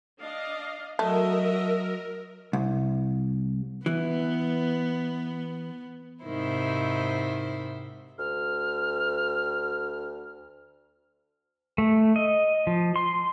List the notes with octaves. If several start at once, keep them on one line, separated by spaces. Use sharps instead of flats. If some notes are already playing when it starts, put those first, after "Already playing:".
D4 D#5 F5
F#3 A3 F#4 A#4 D#5 E5
C2
E3 B3
G#2 C3 D#3 E4 C5
D2 F6
A3
D#5
F3
C6